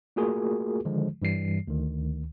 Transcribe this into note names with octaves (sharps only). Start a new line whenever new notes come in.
A3 A#3 F4 F#4 G#4 A#4
D3 D#3 F3 G#3
G2 E3 G3 C7
D2 D#3